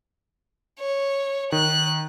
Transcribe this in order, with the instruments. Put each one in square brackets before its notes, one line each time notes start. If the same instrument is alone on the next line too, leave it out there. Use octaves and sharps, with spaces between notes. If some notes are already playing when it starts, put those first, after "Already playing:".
[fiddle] C#5
[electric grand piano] D#3 [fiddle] F#6